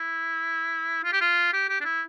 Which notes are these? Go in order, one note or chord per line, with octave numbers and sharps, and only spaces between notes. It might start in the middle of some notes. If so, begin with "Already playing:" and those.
Already playing: E4
F4
G4
F4
G4
G4
D4
E4